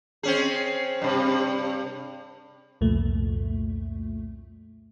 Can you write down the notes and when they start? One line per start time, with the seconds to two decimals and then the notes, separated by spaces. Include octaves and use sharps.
0.23 C4 C#4 G#4
1.02 G2 C3
2.81 C2 F2 A#2 A3